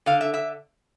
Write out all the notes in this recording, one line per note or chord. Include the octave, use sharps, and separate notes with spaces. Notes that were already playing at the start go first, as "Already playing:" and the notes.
D3 F5
E5
E5